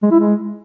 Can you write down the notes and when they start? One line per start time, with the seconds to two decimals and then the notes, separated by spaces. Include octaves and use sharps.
0.03 G#3
0.11 E4
0.19 G#3